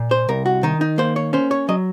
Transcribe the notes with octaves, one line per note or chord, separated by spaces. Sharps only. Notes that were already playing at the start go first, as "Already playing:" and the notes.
Already playing: A#2
C5
C2 A#4
F#4
D#3 D#4
D#4
A#3 C5
C#5
C#4 C5
C#5
F#3 D#5